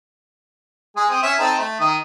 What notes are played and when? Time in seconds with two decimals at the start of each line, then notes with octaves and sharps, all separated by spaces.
0.96 G#3 G#4
1.10 C4 D#6
1.23 C#4 C#5 E5
1.39 C4 D#4 A4
1.59 A3
1.80 D#3 D#6